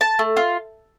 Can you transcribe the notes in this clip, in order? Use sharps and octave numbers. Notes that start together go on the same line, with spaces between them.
A5
A3
F4